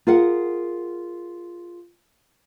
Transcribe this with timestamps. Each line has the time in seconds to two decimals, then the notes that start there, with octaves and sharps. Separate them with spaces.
0.07 F4 G#4 A#4 F5 F#5